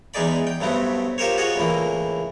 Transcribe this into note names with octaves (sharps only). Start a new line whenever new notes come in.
E2 G#3 D#4 G#4 D5 B5
G5
G2 F#3 A3 B3 C4
F4 G4 A#4 C5 C#5
F4 F#4 G#4 C#5 D#5
C#2 A2 E3 A#3